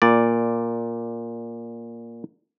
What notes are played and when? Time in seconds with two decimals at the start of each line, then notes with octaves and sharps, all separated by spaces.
0.02 A#2 D5